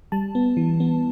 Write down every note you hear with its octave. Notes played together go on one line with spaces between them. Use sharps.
G3 A5
B3
E3
B3